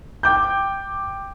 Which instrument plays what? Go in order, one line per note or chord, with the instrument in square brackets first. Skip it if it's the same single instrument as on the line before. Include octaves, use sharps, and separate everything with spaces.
[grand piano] G5 D6 G6